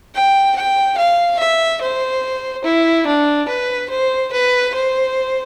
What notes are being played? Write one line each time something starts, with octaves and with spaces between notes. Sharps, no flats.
G5
G5
F5
E5
C5
E4
D4
B4
C5
B4
C5